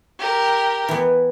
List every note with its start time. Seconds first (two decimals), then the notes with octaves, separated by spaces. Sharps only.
0.18 G4 A#4
0.88 E3 B3